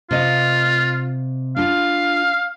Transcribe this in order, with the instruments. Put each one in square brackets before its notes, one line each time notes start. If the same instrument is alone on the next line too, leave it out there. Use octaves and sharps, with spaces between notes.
[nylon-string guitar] C3 D#5 F5 [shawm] F4
[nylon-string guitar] D4 F4 [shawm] F5